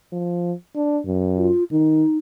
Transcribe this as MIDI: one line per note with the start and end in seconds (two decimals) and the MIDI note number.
0.12 0.53 53
0.76 0.99 62
1.06 1.51 42
1.36 1.64 65
1.71 2.04 51
1.71 2.18 63